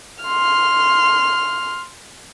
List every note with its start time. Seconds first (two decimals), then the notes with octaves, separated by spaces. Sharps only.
0.24 C6 F6